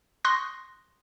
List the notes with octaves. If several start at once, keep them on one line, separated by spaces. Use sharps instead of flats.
C6 C#6 D#6 F#6 A#6